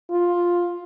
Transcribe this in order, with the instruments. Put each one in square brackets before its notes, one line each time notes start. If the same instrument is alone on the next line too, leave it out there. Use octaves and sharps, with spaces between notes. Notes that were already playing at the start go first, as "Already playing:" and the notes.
[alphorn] F4